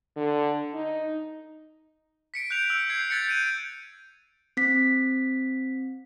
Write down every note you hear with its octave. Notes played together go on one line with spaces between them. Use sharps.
D3
D#4
B6 C#7 D7
F#6 G6 D7 F7
E6
G6 G#6 C7
F#6 G#6 A6 B6 C#7
G6 D7 D#7
C4 B6